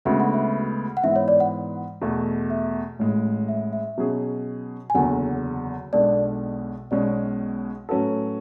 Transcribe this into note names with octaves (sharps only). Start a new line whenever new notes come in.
D2 C#3 G#3 B3 F#4 E5
F#5
E5
F#5
G#2 E3 B3 E5
C#5
D5
F#5
E2 B2 A3
E5
A1 A2 G#3
E5
E5
B2 F#3 C#4 G#4
G#5
F#1 E2 D3 F#3 F#5
B1 B2 G#3 D4 A4 D5
B1 B2 G#3 C#4 D5
A2 F#3 C#4 F#4 A4 B4